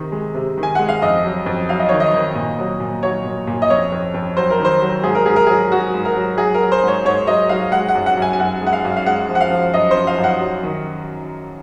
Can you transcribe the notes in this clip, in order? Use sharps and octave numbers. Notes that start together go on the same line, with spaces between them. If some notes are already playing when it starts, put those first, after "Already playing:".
Already playing: C3 D#3
G#3
C3
D#3
G#5
G#3 F#5
F5
F2 D#5
F#3
F2
F#3 F5
D#5
D#3 C#5
D#5
D#3
A#2
F#3
A#2
F#3 C#5
A#2
A#2
D#5
F2 C#5
F2
F2
F#3 C5
A#4
D#3 C5
F#3
G#2 G#4
A#4
G#2 G#4
A#4
F#3 G#4
F#3 F#4
G#2
A#4
F#3
F#3 G#4
A#4
F#3
C5
G#2 C#5
G#2 C#5
F#3 D#5
F#3 F5
G#3 F#5
F#5
F#2
F#5
F#2
G#5
G#5
F#2 F#5
G#3
F#5
F5
F#2
F5
G#3 F#5
F3
F#5
F5
F3
F#2 D#5
F3 C5
F5
F#2
F#5
F#3
D#3